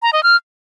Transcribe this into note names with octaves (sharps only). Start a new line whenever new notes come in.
A#5
D#5
F6